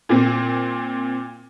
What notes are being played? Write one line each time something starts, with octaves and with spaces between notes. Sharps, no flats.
A#2 C4